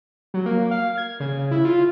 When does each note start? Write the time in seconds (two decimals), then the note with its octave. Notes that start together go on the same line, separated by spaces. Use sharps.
0.34 F#3
0.46 A#3
0.71 F5
0.97 G#6
1.20 C#3
1.51 E4
1.65 F4